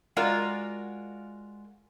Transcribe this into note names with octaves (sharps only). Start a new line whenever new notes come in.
G#3 F4 F#4 A#4 D5